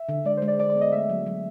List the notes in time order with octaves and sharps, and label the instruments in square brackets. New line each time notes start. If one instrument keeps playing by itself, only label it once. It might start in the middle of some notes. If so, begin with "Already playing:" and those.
Already playing: [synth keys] E5
[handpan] D3
[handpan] G#3 [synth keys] D5
[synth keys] C5
[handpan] G#3
[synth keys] D5
[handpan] G#3 [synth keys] D5
[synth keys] D5
[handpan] B3
[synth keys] D#5
[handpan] A3 [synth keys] E5
[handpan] F#3
F#3